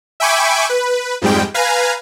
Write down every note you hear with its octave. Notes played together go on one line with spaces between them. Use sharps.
E5 G5 G#5 B5 C#6 D6
B4
F2 G#2 G3 G#3 G5
B4 F5 G#5 A#5